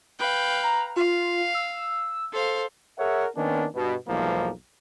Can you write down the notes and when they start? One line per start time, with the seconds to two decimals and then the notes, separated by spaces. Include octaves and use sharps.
0.19 B4 F5 G5
0.64 A#5
0.96 F4 F5
1.54 E6
2.33 A4 C5 F5
2.99 G#4 A#4 C#5 E5 F#5
3.37 D#3 A#3 B3 C#4 D4
3.75 G2 B2
4.08 B1 E2 G#2 F3 A#3